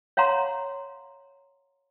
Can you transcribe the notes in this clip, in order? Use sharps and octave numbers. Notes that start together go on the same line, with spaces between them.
C#5 F5 F#5 A#5 C6